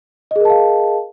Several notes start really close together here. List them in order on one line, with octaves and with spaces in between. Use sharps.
D#5 G#4 A#4 A5 F5